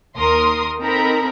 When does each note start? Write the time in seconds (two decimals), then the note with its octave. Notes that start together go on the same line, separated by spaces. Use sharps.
0.16 D#2 A#4 C6 D#6
0.81 C4 D#4 A4 A#4 A#5 B5